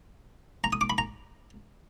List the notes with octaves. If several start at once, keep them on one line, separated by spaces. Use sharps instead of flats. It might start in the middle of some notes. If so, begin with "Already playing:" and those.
A#5
D#6
D6
B5
A#5